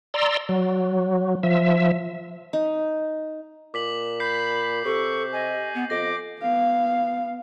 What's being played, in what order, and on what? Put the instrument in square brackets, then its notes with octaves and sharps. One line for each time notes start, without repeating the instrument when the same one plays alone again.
[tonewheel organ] D5 A#5 C6 E6
F#3
F3 E5
[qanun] D#4
[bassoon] A#2 [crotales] D6 B6 F#7
[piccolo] B5 [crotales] G6 B6 C7
[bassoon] C3 [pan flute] A4 [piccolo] C#6
[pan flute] D#5 [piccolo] G#5
[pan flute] B3
[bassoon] F2 [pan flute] D#5 [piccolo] D6 [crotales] A#6
[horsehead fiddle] B3 F5